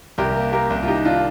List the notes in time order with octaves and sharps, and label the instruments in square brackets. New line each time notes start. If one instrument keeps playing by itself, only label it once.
[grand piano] C2 [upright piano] G4 A#4
[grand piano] A#3
[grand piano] A#3 [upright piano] G4 A#4
[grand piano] C2
[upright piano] F4
[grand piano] D#3 [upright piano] D#4 G4
[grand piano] D#3 [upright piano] D4 F4